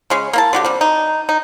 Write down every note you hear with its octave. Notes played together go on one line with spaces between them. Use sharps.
C#3 G#3 C#4
A#3 E4 A5
D3 F#4 G4
C3 G3
D#4
D#4